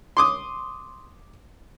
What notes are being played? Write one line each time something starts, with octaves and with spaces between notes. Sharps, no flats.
C6 D6 D#6